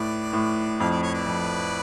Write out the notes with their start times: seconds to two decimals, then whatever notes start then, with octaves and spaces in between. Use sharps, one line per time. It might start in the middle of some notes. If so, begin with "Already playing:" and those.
Already playing: A2 B4 D5
0.33 A2
0.80 F2 F5
0.91 D5
1.03 C#5
1.14 B4 D5
1.27 F2